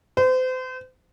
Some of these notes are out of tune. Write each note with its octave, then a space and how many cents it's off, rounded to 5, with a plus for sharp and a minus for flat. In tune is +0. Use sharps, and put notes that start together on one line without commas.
C5 -35